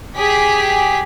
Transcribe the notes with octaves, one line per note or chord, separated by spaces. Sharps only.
G4 G#4 B6